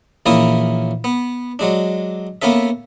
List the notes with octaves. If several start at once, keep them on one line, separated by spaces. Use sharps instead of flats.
A#1 E3 A#3 C#4 E4 D#6
B3
F#3 G#3 D4
A#3 B3 C#4 A4 E5